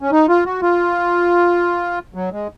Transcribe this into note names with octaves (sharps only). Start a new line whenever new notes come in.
C#4
D#4
F4
F#4
F4
F#3
G#3